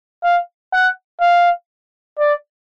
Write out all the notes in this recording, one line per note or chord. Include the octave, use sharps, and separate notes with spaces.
F5
F#5
F5
D5